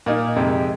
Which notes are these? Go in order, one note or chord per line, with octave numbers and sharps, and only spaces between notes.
A#2 A#3 D#4
F2 C3 G#3